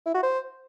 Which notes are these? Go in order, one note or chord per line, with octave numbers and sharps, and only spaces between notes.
E4
F#4
C5